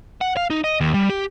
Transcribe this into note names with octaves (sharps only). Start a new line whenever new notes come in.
F#5
F5
D#4
D#5
D#2
G3
G4